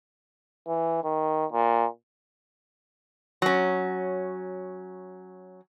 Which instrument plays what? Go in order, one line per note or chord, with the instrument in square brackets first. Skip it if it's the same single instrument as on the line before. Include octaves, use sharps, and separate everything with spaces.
[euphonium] E3
D#3
A#2
[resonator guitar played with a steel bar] F#3 C#4